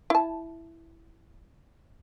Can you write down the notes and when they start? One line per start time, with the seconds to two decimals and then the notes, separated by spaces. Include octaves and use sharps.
0.10 E4 A5